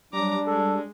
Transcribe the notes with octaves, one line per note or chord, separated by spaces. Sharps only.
F#3 G3 D4 A#5 D6
G#3 A4